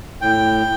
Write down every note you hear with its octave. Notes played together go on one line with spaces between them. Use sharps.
A2 G5